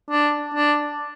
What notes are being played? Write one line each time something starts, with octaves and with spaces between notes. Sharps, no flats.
D4
D4